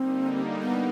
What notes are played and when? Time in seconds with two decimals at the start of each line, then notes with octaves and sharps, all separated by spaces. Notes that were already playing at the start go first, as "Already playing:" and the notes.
Already playing: D3 G3 A#3 C4 D#4
0.63 B3